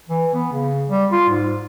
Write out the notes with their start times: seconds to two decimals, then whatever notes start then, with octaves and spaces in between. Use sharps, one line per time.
0.10 E3
0.34 B3
0.52 C#3
0.90 G3
1.12 F4
1.29 G#2